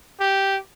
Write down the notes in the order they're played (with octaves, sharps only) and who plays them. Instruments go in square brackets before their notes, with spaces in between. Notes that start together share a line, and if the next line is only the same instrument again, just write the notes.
[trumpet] G4